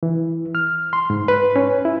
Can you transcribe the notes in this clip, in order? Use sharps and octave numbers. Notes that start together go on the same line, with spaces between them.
E3
F6
C6
G#2
B4
C#4
E4